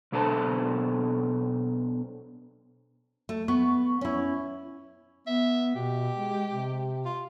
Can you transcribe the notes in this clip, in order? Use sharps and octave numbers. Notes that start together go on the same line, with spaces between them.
B1 B2 D4 A4 C5 A5
A3
B3 C#6
C#4 E4
B3 E5
B2 G4
G#3
C3
F4